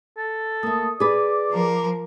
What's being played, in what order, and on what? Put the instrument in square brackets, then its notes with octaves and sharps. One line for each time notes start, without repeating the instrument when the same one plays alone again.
[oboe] A4
[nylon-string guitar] A3 A#3 [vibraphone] D#6
[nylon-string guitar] G#4 B4 [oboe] D5 [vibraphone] D6
[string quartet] F3 A#4